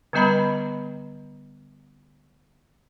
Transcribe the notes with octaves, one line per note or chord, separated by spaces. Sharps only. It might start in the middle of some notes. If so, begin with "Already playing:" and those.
D3 G3 B3 D#5 A#5 B5